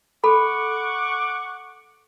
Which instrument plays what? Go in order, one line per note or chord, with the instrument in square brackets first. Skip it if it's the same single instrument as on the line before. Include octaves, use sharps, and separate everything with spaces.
[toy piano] A4 B5 [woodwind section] F#5 C#6 D6